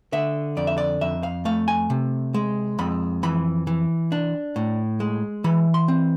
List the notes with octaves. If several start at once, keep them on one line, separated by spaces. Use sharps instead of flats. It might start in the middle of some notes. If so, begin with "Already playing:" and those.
D3 E5
F2 D5
E5
D5
F2 E5
F5
A3 F5
G#5
C3
G#3
F2 B5
E3 B5
E3
D4
A2
G#3
E3 B5
C6
C4